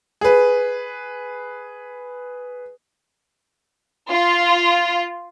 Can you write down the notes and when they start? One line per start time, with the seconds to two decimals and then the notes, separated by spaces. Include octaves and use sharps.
0.21 G#4 B4
4.10 F4